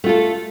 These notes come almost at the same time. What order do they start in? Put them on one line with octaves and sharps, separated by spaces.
A3 F4 A4